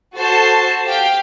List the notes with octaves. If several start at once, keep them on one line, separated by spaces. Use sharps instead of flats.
F#4 A4 C5 A5 C7
G4 F5 G5